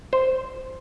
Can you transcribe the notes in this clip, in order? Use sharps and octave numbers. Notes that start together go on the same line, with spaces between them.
C5